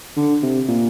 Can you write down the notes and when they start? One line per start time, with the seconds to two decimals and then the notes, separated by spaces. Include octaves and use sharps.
0.16 D3
0.42 C3
0.68 A#2